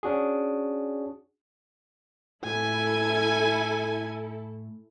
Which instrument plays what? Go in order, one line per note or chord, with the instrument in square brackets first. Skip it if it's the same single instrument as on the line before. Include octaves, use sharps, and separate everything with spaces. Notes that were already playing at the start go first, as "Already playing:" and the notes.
[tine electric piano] C#4 D4 F#4 G#4
[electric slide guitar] A2 [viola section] E4 A4 [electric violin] G#5